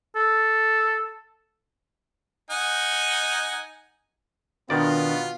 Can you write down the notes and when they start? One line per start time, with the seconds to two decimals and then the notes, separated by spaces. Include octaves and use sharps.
0.16 A4
2.51 D#4 F#5 G#5
4.70 B2 D#3 B3 D4 F4 D5